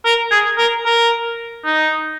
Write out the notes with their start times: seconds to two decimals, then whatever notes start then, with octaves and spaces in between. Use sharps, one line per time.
0.06 A#4
0.31 G#4
0.58 A#4
0.86 A#4
1.66 D#4